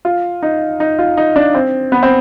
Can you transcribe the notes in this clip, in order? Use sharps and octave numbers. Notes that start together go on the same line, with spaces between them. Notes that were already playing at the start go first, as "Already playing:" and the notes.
F4
D#4
D#4
F4
D#4
D4
C4
B3
C4